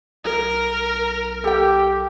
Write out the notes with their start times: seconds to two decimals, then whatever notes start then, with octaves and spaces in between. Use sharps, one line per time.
0.24 B1 A#4
1.44 G4 A4 G5